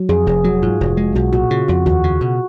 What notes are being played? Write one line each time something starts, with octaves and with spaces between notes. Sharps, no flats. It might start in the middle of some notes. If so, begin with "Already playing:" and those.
Already playing: F#3
F2 G#4
F1 G#4
F#3 F#4
G#2 F4
F1
G#3
B1 F#4
A#2 F#4
C#3 F4
F2 F#4
D#2 F#4
C#3
B2 F#4